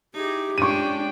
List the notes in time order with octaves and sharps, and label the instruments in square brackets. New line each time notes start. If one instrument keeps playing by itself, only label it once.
[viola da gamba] D#4 E4 G#4 [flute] G4
[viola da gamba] G#3 C#4 F4 [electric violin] D4 G5 [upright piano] C#6 D#7